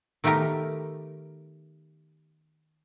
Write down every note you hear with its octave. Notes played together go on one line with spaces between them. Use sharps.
D#3 A3 B3 G4 A#4